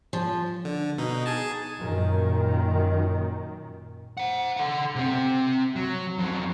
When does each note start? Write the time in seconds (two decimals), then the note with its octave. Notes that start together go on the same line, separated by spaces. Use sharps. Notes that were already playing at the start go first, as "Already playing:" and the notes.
0.13 F3
0.65 D3
0.98 B2 D#4
1.26 G#4 G#5 A5
1.79 F#2 A#2 D#3
4.17 C5 F#5
4.57 A4 F#5
4.96 C3 C4
5.76 F#3
6.18 F2 F#3